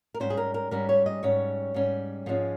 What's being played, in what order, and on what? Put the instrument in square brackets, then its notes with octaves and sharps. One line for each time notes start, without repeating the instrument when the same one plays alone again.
[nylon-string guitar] A#4
G#2 G3 C#4 C5
G#4
A#4
A#4
G#2 G3 C#4 A#4
C#5
D#5
G#2 G3 C#4 C#5
G#2 G3 C#4
G#2 F3 G#3 C#4